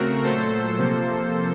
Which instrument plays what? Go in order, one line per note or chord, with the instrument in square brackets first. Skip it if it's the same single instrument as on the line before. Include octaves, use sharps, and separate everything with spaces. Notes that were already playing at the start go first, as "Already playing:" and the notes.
Already playing: [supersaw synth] C#3 A3 C4 F#4 A#4
A#2 F#3 A3 A4 C5
C3 F3 A#3